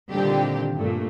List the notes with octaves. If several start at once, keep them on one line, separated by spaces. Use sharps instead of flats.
A#2 D3 D#3 G3 C4 G4
G2 A#2 A3